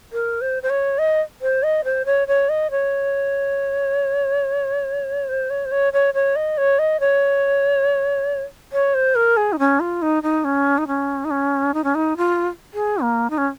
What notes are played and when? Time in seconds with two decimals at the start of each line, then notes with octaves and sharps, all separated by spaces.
0.13 A#4
0.41 C5
0.63 C5
0.70 C#5
0.98 D#5
1.42 C5
1.63 D#5
1.85 C5
2.06 C#5
2.28 C#5
2.49 D#5
2.71 C#5
5.29 C5
5.50 C#5
5.65 C5
5.72 C#5
5.93 C#5
6.14 C#5
6.36 D#5
6.58 C#5
6.79 D#5
7.00 C#5
8.72 C#5
8.94 C5
9.15 A#4
9.37 G#4
9.53 D#4
9.59 C#4
9.80 F4
10.02 D#4
10.23 D#4
10.44 C#4
10.78 D#4
10.87 C#4
11.25 D#4
11.31 C#4
11.74 D#4
11.84 C#4
11.95 D#4
12.17 F4
12.74 G#4
13.02 A#3
13.30 D#4
13.38 C#4